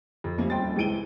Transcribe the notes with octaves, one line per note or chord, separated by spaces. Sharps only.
F2
F3 G3 A3 A#3 C#4 C#5
D#1 C4 G5 C6 A6
C#2 C#3 E3 D7 D#7 G7